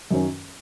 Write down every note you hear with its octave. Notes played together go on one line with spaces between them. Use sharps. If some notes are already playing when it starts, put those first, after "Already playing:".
F#2 D#3 F#3 C#4